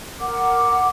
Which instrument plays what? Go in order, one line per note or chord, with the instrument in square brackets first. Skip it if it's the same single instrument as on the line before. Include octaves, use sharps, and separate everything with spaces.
[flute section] A#4 F#5 D6